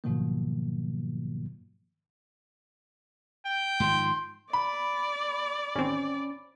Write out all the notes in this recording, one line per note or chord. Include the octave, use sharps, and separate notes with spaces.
G#2 B2 D#3 F3 F#3 A#3
G5
G#2 D#3 F3 C6
D5 B5
A1 D#2 C4 C#4